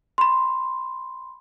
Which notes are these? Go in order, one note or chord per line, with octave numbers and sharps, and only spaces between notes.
B5 C6